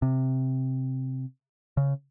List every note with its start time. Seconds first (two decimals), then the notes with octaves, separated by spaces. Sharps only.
0.02 C3
1.77 C#3